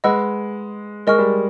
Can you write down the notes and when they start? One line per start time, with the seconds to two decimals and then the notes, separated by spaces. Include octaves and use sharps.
0.04 G#3 B4 D#5 F#5 B5 E6
1.07 G#3 A#4 D#5 G#5 C#6 F6
1.19 G3